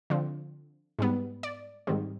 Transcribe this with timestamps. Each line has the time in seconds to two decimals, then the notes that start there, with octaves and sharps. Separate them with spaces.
0.10 D3 F3 C4
0.99 G#2 G3 B3
1.43 D5
1.87 G#2 D#3 G3 C4